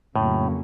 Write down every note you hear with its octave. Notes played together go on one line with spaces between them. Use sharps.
F2 A2 C#3 F#3 A#3 C#4